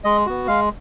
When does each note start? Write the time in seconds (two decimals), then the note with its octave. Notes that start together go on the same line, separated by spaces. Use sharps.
0.04 G#3 D#5
0.26 B3 F#4
0.47 G#3 F5